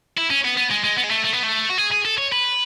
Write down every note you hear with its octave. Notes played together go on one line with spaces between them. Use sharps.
E4
C#4
B3
B3
G#3
G#3
B3
G#3
A3
A3
B3
A3
F#4
G#4
G#4
A4
C#5
B4